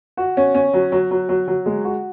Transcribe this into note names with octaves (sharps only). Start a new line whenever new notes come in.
F#4
C#4
C#4
F#3
F#3
F#3
F#3
F#3
G#3
F#4